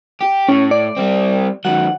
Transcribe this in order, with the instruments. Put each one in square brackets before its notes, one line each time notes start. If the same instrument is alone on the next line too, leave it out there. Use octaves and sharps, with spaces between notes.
[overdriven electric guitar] G4
[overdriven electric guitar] A2 [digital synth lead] C#4
[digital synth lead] D5
[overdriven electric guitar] G3 C4
[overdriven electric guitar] D#3 F#3 [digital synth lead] F#5